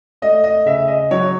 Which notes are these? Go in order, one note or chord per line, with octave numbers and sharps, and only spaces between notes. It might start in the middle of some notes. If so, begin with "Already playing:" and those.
A3 D#5
D#5
C#3 E5
D#5
F#3 C#5